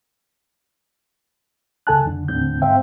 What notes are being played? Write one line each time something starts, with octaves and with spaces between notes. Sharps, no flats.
C#2 C#3 A4 G#5 A5 F#6
F2 D3
D#2 A2 D3 C4 G6
G#2 C4 C5 E5 F5 G5